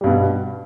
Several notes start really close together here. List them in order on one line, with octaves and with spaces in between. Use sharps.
G3 G2 B2